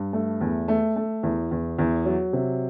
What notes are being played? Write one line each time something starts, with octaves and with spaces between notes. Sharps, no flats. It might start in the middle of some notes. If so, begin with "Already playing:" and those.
Already playing: G2
A3
E2
A3
A3
E2
E2
E2
F#3
C3